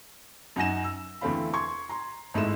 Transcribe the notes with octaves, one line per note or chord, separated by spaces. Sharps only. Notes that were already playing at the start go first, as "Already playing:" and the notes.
F#2 D#4 F#5 G#5 A#6 E7
E6
E2 D3 A3 C4 F5 B5
C6 C#6 G#6
A#5 C6
G#1 G#3 A3 E4 E7